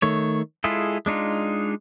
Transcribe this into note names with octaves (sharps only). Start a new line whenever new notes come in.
D#3 A3 C#5
G#3 E4 F4 G#4 A4
G#3 D4 D#4 F4